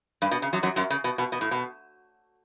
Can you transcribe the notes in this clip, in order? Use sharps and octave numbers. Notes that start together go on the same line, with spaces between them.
G2
B2
C#3
F#2 F#3
F#2 F#3
F#2 F#3
C#3
B2
B2
B2
A2
B2